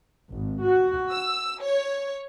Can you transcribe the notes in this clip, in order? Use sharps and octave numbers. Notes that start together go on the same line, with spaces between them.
G#1
F#4
E6
C#5